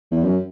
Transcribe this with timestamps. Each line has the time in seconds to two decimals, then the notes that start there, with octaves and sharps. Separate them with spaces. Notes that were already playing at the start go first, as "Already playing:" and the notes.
0.11 E2
0.23 F#2